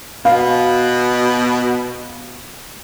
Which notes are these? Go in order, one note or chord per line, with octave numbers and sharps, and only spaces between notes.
B2 F5